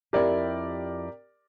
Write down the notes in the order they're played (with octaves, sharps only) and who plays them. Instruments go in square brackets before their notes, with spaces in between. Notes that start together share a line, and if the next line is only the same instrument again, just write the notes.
[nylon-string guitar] F2 E4 [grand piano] G4 A#4 D5